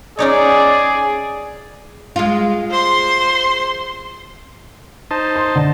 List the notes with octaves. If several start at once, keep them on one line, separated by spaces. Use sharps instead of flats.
C#4 D#4 G#4 C#5 D5
G#3 F4
C5 C6
D#4 C5 A5
C6
D3